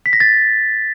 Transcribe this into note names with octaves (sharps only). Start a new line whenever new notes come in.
B6
A#6
A6